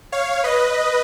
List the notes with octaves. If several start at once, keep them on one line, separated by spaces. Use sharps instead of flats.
C#5 F5
B4 D#5